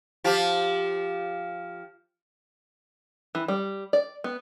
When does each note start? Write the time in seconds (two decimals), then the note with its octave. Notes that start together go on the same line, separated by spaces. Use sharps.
0.24 F3 F4 G4
3.35 E3
3.48 G3
3.93 D5
4.24 B3